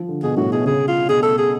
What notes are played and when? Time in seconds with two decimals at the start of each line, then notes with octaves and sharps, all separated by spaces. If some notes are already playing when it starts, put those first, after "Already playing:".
Already playing: F3
0.08 D3
0.23 B2 G#4
0.37 A2 F#4
0.52 B2 G#4
0.65 C#3 G#4
0.88 F4
1.09 B2 G#4
1.23 A4
1.38 G#4